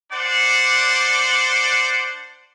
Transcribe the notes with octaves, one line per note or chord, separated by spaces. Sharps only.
D4 C5 D5 F#5